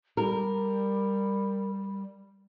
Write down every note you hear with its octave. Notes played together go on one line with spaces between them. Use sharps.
G3 A#4